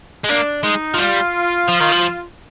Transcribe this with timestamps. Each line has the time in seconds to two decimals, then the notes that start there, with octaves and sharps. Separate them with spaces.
0.24 G#3
0.29 A#3 D4
0.63 G#3 D#4
0.94 F3
0.98 G3 F4
1.68 F3
1.80 D#3
1.92 F3